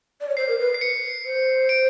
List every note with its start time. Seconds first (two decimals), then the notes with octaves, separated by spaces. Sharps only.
0.21 D5
0.29 C#5
0.37 C5 C7
0.48 A#4
0.59 B4
0.74 C7
0.81 C#7
1.26 C5
1.69 D7